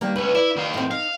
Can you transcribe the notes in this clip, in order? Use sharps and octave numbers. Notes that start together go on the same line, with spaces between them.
D#3 G3 A#3
C#2 B4
E4 D5
D#3 F5
A2 C4
D#4 F5